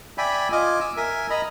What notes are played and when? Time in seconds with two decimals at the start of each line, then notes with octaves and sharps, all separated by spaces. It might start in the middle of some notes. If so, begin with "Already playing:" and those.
0.18 D5 E5 G5 G#5 B5
0.52 F4 D#5 G#5 D6
0.81 D6 E6
0.97 A#4 E5 G#5
1.30 D#5 A#5 B5